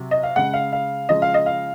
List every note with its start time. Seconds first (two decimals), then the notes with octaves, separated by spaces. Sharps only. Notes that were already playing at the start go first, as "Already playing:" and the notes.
Already playing: C3 F#3
0.11 D#5
0.23 F5
0.36 C#3 G#3 F#5
0.54 F5
0.73 F5
1.09 C#3 F3 G#3 D#5
1.22 F5
1.34 D#5
1.46 F5